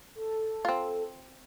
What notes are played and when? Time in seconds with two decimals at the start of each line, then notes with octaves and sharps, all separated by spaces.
0.15 A4
0.65 C4 F4